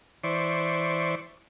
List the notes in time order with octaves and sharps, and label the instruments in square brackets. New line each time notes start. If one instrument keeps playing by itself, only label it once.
[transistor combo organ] E3 C5 D5 C#6